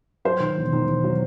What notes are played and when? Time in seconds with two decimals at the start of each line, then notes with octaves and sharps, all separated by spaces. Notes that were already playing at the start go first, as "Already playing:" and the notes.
0.25 F#3 C5
0.40 D#3
0.57 E1
0.73 D#3
0.88 E1
1.04 F#3